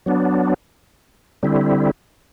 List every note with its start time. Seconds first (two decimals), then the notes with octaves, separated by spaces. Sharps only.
0.06 F#3 B3 D4
1.43 D3 G3 C4 E4